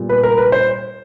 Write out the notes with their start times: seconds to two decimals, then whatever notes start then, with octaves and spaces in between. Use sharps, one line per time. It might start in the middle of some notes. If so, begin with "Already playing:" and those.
Already playing: A#2 G3 B3
0.09 B4
0.23 A#4
0.38 B4
0.52 C5